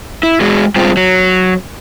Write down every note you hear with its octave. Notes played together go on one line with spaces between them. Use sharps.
E4
G#3 F#4 G#4
G3 G#3 C4 F4
F#3